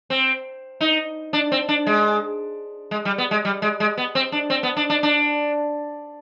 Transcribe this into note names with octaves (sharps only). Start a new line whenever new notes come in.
C4
D#4
D4
C4
D4
G#3
G#3
G3
B3
G#3
G3
G#3
G#3
B3
C4
D4
C4
B3
D4
D4
D4